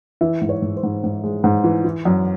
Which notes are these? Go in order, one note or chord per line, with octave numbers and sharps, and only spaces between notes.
E3 E5
G#2
C#5
G#2
C5
G#2
G#2
G#3
G#2
E3
E3
F#2